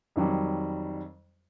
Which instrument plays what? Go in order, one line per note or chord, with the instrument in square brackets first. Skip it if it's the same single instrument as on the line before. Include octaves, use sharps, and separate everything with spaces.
[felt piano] F2 D#3 F#3 G3